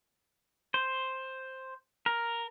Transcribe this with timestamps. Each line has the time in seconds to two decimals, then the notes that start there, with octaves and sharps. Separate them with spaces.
0.74 C5
2.06 A#4